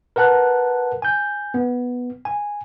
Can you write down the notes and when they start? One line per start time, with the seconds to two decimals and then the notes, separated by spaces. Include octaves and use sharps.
0.16 A#4 B4 F#5 A5 F#6
1.02 G#5 G6
1.54 B3
2.25 G#5